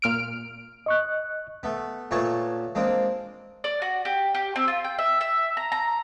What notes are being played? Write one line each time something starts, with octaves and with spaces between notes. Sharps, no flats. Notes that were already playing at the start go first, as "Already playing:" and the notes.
A#2 F6 D7
D#5 C#6 F#6
A3 B3
A#2 A3 B3 C#5 A5 C#6
G#3 A#3 C4 D4
D5
F#4
G4
G4
C4
F4
G5
E5
E5
A#5
A#5